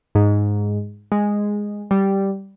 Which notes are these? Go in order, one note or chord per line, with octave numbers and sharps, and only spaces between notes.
G#2
G#3
G3